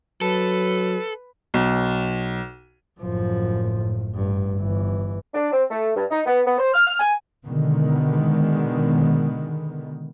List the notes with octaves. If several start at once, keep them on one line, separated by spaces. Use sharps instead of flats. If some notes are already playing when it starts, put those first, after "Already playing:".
F#3 A4 B4
B1
F#1 F#2 A2 F3
A1 G2
G1 E3
D4
C4
A3
G2
D#4
B3
B3
C5
F6
F6
G#5
B2 D3 D#3 G#3 B3